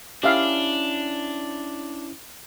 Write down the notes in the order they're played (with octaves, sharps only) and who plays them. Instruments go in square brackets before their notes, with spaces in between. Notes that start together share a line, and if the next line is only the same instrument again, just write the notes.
[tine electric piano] C#4 E4 [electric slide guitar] D4 [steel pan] G4 E5 F5